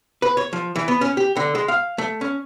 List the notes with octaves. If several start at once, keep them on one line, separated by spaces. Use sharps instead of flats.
B4
C#5
F3
E3
B3
C#4
G4
D3
G#3
F5
A3
C#4